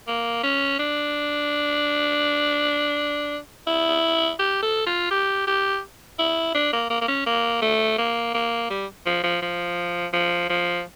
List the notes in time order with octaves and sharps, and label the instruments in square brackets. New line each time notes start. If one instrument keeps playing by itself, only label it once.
[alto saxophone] A#3
C#4
D4
E4
G4
A4
F4
G4
G4
E4
D4
A#3
A#3
A#3
C#4
A#3
A3
A#3
A#3
G3
F3
F3
F3
F3
F3